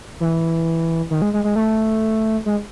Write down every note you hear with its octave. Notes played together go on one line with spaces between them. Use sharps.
E3
D#3
G#3
G#3
G#3
A3
G#3